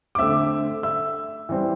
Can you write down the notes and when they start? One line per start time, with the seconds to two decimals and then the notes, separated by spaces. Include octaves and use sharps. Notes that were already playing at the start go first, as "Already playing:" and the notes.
0.15 D6
0.19 D3 A3 C4 E5 E6
0.83 E5 E6
1.49 E3 G3 C4